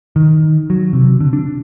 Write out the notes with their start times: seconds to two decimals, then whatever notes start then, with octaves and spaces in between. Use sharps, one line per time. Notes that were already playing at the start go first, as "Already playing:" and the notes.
0.16 D#3
0.70 F#3
0.93 C3
1.20 D3
1.33 D4